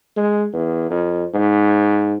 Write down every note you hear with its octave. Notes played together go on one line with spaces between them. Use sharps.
G#3
E2
F2
G#2